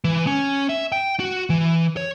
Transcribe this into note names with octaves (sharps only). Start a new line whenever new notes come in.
E3
C#4
E5
G5
F#4
E3
C#5